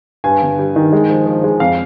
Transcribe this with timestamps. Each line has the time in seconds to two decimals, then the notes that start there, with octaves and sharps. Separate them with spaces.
0.24 G2 G#5
0.42 G1
0.59 G3
0.76 D#3
0.93 G#3
1.09 F3
1.26 F3
1.44 G#3
1.60 F2 F5